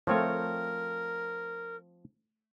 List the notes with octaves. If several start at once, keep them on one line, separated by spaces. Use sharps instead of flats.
F3 A3 C4 F4 A#4 C#5